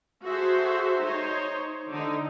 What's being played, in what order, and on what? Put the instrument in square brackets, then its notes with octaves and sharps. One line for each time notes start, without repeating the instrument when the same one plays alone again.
[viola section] F#4 G#4 A4 C5 E5
D#4 C5 C#5
D3 D#4